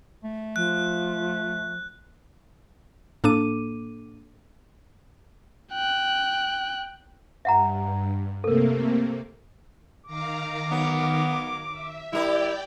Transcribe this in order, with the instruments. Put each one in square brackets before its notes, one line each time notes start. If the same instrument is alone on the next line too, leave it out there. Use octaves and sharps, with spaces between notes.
[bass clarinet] A3
[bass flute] F3 [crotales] F#6
[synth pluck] A2 A#3 D4 A4 D6 D#7
[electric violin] G5 F#6
[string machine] G2 [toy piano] E5 F#5 A#5
[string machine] C3 A3 A#3 [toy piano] A4 A#4
[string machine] D#3 F5 A#5 [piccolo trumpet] D6
[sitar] F#3 [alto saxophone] B3
[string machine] E5
[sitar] G3 G4 A#4 [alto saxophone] E4 [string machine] D5 G5